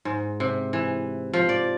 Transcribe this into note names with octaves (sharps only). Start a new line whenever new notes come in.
G#2
C3
E3
F3
D5